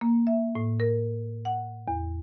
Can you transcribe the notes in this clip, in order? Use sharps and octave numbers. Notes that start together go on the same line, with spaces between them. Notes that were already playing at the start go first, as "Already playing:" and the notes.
A#3
E5
A2
A#4
F#5
E2